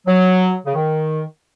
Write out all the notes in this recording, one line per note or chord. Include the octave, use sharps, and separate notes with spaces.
F#3
C#3
D#3